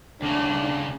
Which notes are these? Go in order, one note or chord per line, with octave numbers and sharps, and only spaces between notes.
D2 C#3 D4